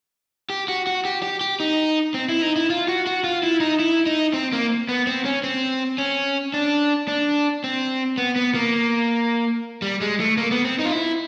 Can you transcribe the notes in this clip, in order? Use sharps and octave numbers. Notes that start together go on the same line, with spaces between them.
G4
F#4
F#4
G4
G4
G4
D#4
C4
E4
D#4
E4
F4
F#4
F#4
F4
E4
D#4
E4
D#4
C4
A#3
B3
C4
C#4
C4
C#4
D4
D4
C4
B3
B3
A#3
G3
G#3
A3
A#3
B3
C4
D#4
F4
E4